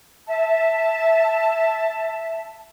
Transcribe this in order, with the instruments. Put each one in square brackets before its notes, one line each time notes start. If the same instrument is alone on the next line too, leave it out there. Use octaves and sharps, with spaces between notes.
[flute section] E5 A5